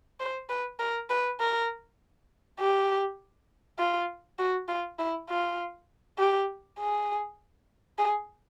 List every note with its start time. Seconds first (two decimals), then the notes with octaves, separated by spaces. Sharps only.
0.20 C5
0.50 B4
0.80 A#4
1.10 B4
1.40 A#4
2.60 G4
3.79 F4
4.39 F#4
4.68 F4
4.99 E4
5.30 F4
6.19 G4
6.79 G#4
7.98 G#4